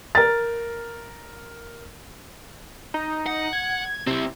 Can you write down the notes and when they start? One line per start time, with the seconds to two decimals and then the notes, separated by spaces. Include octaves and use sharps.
0.15 A#4 A6
2.94 D#4
3.26 F#5
3.53 G#6
4.07 C3 C4 E4